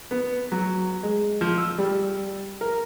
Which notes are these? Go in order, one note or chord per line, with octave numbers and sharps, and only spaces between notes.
B3
F#3
G#3
F3
E6
G3
A#4